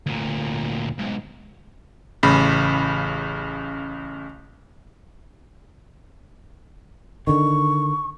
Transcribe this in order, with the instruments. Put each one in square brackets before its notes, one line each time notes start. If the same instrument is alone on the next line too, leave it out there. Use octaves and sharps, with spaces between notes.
[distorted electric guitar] D2 A#2
B1 G#2
[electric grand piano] A1 C#3 B5
[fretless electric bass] D3 D#3 [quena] C#6